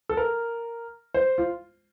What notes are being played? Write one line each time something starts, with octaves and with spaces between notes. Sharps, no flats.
A4
A#4
C5
F4